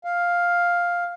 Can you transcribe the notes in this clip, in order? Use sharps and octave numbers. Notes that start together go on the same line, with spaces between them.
F5